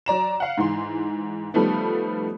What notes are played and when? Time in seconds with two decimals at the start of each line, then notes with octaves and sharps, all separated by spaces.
0.06 F#3 D5 A#5 E7
0.40 F5 F#5
0.58 G#2 E3 C6
1.54 D#3 F3 G3 A3 B3